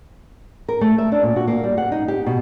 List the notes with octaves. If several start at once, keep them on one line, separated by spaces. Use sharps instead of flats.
A#4
A3
E5
D4
A#2
F#4
A#3
G3
F#5
D#4
G4
B2